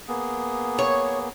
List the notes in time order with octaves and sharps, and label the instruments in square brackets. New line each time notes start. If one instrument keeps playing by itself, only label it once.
[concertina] A#3 B3 G#4
[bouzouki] C#5